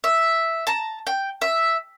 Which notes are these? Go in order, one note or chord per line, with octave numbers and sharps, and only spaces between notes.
E5
A5 A#5
G5
E5